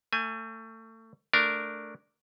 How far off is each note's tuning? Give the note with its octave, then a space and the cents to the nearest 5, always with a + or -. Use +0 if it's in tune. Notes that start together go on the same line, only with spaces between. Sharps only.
A3 +30 G#5 +0
A3 +0 D4 +0 A#4 +0